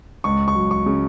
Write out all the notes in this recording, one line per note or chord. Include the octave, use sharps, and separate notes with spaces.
C#2 C#6
C#6
F#3
C#6
C#3